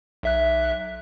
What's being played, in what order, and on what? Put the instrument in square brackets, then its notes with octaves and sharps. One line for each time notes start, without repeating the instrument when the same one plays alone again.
[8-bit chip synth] B1 E5 F#6